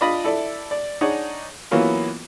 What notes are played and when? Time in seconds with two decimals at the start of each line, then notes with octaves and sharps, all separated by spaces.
0.01 D4 F4 D5 D#5 B5
0.24 E4 A4 D5 E5
0.71 D5
1.01 D4 D#4 G#4 C#5 F#5
1.71 E3 F#3 A#3 B3 C#4 F4